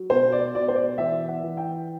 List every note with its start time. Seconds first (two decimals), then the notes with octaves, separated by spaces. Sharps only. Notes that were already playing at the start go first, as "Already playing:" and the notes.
Already playing: F#3
0.10 B2 C5
0.32 D5
0.54 B2 D5
0.68 C5
0.76 D5
0.98 E3 E5
1.28 F#5
1.43 E3
1.57 G5